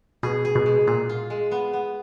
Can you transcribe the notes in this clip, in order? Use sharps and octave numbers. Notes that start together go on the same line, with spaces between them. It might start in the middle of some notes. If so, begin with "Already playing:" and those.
B2 G#4
G#4
B2
G#3
A#2 G#4
F4
G#3
B3
B3